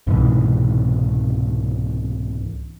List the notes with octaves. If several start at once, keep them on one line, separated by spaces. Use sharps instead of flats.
C2 G#2 B2 E3